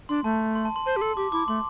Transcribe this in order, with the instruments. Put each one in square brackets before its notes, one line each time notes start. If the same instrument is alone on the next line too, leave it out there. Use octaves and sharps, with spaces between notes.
[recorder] D4 [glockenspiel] C6
[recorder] A3 [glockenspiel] A5
[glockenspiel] C6
A5
C6
[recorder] C5 [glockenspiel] A5
[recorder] G4
[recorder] A4 [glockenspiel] C6
[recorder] G4 [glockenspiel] D6
[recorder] E4 [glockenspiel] D6
[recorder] A3 [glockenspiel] C6